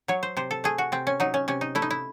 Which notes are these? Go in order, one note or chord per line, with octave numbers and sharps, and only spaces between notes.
F#3 C#5
C5
C3 C5
A4
A3 G#4
F#4
C3 C4
C#4
F#3 D#4
C#4
C3 C#4
D#4
A3 E4
D#4
E4